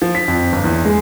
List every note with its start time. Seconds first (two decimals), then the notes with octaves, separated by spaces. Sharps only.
0.02 F3
0.15 B6
0.28 F2
0.52 G1
0.64 E2
0.85 G#3